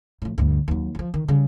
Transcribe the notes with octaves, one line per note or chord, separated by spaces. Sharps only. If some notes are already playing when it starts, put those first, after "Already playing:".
A2 F3
D2 G2
D#2 F#3
F3 F#3
D#3
C#3 G3